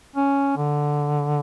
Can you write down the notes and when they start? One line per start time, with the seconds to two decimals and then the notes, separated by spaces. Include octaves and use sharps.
0.16 C#4
0.57 D3